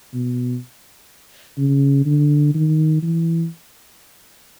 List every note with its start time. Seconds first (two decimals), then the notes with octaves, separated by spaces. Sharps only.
0.14 B2
1.58 C#3
2.06 D3
2.55 D#3
3.03 E3